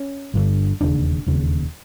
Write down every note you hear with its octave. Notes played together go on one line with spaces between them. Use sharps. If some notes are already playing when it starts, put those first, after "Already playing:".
Already playing: C#4
G1 G2 D3
E1 D#2 C#3 D4
E1 D#2 C#3